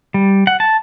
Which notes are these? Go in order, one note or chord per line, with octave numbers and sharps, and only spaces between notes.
G3
F#5
A5